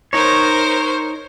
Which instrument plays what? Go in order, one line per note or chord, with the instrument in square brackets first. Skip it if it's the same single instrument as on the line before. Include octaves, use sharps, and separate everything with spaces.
[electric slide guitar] D#4 C#5 [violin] A#4 C5